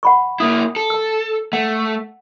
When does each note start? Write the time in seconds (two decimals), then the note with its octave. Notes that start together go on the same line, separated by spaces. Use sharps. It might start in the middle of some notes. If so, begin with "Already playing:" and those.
0.03 F#5 B5 C#6
0.40 A#3 E4 D#6
0.76 A4
0.90 A5 E6
1.53 A3 F#5